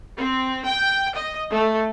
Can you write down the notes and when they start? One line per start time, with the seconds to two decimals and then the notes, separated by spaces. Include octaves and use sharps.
0.17 C4
0.66 G5
1.15 D#5
1.50 A3